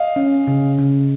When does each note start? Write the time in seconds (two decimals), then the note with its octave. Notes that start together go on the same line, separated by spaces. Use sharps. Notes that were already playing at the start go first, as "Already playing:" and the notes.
Already playing: D#5 F5
0.16 C#4
0.47 C#3
0.78 C#3